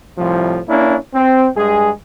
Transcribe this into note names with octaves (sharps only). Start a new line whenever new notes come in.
C2 A2 F3
A#3 C#4 D4 E4
C4
G2 G#3 G#4